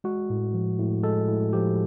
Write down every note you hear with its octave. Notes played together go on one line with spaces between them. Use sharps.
G#3 F#4
A2
F3
A2
G#3 A4
A2
F3 G4